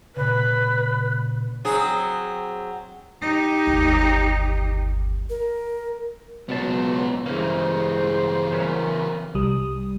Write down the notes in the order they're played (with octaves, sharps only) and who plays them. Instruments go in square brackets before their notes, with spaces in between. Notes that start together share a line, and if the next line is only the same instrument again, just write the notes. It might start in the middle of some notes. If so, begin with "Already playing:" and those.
[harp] A#2 C#3 [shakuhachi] B4
[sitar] F#3 C4 G#4
[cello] D#4 G4
[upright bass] G1 D#2
[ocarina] A#4
[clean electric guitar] C#2 B2 A5 [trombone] F#3 [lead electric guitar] B3 C#4
[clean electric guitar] G2 A#3 [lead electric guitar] C#3 E3 [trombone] G#3 [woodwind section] G#4 C5
[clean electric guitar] F#3 B3 C#4 [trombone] A#4
[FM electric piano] C2 G3 D#6